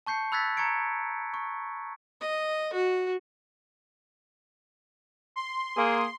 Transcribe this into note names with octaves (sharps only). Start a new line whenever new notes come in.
A5 C#6 G6 C7 C#7
B5 E6 F#6 G#6 A6 B6
A#5 C#6 G#6 C#7 D7
C#6
D#5
F#4
C6
A#3 G#4